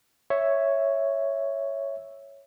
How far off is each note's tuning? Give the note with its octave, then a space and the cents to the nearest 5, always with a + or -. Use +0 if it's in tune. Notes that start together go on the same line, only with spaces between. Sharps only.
C#5 +0 E5 +0